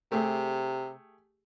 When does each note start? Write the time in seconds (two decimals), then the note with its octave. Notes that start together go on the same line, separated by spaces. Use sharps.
0.12 C3 A3 G4 G#4